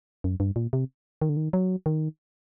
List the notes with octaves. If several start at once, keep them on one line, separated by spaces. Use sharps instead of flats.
F#2
G2
A#2
C3
D#3
D3
D#3
F#3
D#3